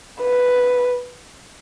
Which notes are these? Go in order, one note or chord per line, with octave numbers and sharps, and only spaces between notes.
B4